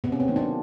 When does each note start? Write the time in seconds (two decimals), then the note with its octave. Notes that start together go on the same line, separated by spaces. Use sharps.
0.04 C3 B3
0.12 C#4
0.20 C4
0.28 D#3 F#3 A#3
0.36 D4